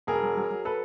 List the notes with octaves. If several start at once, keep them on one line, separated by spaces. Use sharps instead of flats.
E1 G#4 A#4
F#3
F#3
F#3
A4 B4